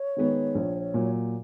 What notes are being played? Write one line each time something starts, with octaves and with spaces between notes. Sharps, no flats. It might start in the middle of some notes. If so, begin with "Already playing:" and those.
Already playing: C#5
D#3 G#3 B3
A#1
A#2 F#3